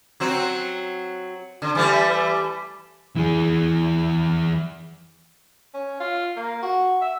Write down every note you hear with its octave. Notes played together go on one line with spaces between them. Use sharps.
F#3 C4 F#4
D3
E3 G3 A3
E3 G#4
C#4
F4
A#3
F#4
E5